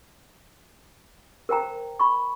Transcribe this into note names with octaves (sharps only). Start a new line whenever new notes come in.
A#4 C5 G5 A#5
B5 C#6